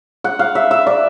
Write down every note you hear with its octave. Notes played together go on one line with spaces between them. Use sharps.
F#5
F5
E5
E5
D5